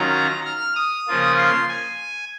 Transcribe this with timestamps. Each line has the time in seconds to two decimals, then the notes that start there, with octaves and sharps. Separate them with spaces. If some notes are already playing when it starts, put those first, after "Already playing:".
Already playing: D#3 F#3 C#4 F4 A#5
0.46 F6
0.76 D#6
1.07 C#3 F3 A#3 F4
1.38 C6
1.69 G#5